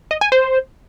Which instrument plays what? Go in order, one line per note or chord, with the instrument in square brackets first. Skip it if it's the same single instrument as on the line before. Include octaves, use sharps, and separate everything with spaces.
[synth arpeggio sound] D#5
G#5
C5